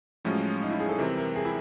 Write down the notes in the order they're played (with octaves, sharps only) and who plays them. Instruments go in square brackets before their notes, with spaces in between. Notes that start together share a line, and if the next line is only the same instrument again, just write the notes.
[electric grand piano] A2 F3 G#3 C#4 F4 [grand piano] F#3
[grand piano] D#4
E4
G#4
A4
[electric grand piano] C3 E3 G3 C4 [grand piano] A#4
[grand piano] A#4
G#4
E4